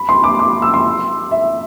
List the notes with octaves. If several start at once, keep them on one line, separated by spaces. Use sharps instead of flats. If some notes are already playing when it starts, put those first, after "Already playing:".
Already playing: B5
C6
D6
D6
E6
C6
E5